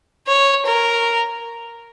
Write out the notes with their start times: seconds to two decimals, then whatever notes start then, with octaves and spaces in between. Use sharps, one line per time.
0.27 C#5
0.65 A#4